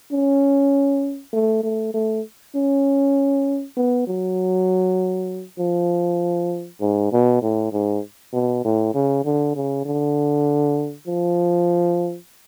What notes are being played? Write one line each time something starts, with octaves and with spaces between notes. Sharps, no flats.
C#4
A3
A3
A3
C#4
B3
F#3
F3
G#2
B2
A2
G#2
B2
A2
C#3
D3
C#3
D3
F3